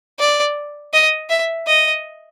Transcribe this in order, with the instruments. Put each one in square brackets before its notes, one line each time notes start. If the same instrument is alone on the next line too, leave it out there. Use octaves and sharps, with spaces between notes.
[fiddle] D5
D#5
E5
D#5